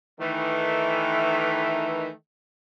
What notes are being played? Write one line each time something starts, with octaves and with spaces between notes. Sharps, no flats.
D#3 E3 A3